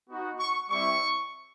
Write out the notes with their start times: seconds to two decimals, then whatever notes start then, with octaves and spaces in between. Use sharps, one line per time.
0.10 B3 D#4 F#4
0.40 C#6
0.70 G3 C4 E4 C#6